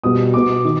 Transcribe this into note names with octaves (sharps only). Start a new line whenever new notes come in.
B2 G3 B3 D#6
B2 B3 D6
D#3